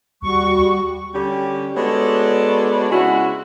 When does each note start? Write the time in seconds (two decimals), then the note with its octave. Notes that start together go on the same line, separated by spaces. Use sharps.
0.22 D#2 G3 F#4 C#6
1.14 D3 G3 C#4 G4
1.75 G#3 B3 D4 F#4 A4 C#5
2.91 C#3 G#3 E4 F#4